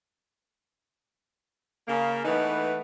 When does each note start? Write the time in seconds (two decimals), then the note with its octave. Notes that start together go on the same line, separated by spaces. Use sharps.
1.88 C#3 A#3
2.25 E3 A3 B3 D#4